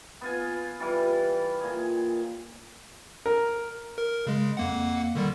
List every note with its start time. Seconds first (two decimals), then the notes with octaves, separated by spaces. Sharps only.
0.21 B3 F4 G#5
0.80 E3 G3 F4
1.60 A#2 G#4
3.26 A#4
3.98 A#4
4.27 C#3 G#3
4.57 F2 A#3 F#5
5.15 D3 D#3 G3